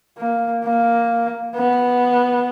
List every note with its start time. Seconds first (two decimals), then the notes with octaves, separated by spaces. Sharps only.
0.18 A#3
0.64 A#3
1.56 B3